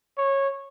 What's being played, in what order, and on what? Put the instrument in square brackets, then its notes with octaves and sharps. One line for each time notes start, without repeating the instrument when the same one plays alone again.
[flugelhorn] C#5